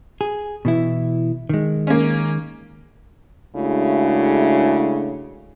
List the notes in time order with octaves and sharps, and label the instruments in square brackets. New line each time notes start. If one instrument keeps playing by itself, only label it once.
[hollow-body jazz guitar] G#4
B2 E3 E4
D#3 G#3
[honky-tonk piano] A#3 C#4
[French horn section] C#3 G#3 A3 D4 E4 F#4